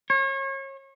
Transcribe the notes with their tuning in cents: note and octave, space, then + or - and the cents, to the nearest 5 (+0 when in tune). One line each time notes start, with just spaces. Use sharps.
C#5 -35